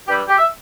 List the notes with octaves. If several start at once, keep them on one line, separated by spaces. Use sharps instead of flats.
G2 E3 G3 G4
G4
E5